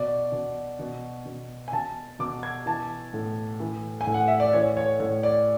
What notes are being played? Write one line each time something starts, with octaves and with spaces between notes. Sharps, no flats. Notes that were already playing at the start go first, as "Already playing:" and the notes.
Already playing: B2 D5
B2
B2
B2
G#5
B2 A5
B2 D6
G#6
E3 A5
A2
E3
G#5
A2
F#5
E5
D5
E3 C#5
C#5
A2 C#5
D5